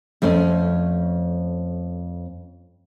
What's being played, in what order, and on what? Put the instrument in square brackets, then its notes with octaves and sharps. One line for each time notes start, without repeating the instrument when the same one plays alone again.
[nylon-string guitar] F2 A3 C#4